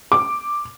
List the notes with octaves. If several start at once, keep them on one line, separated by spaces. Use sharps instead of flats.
D6